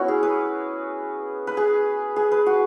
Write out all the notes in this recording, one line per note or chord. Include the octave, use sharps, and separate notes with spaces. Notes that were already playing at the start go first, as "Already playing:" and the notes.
Already playing: B3 C#4 E4 F#4
G#4
B4
B4
G#4
G#4
B4
F#4